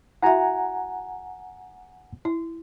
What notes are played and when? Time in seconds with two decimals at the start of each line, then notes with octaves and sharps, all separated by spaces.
0.23 E4 F#4 E5 F#5 G#5 A#5
2.25 E4